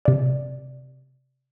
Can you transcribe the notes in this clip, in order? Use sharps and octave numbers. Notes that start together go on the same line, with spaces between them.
C3 D5